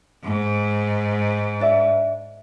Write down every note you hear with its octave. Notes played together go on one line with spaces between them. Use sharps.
G#2
D4 D5 E5